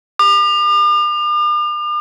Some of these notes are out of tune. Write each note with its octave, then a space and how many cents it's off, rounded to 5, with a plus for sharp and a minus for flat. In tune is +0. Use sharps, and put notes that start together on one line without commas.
D6 +45